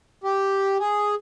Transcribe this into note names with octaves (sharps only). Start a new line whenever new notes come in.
G4
G#4